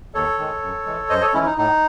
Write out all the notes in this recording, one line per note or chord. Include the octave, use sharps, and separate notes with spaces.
D#2 A4 C#5
D#3 G#3
F#2
E3 G#3
F#2 C5 D#5
A4 C#5
E3 G#3 C#4 E4
D#4
A2 D#4